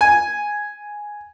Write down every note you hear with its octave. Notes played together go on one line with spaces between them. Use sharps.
G#5